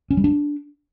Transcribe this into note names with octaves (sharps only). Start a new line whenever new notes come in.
C#4
G3
D4